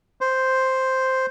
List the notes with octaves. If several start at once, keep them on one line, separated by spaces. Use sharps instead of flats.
C5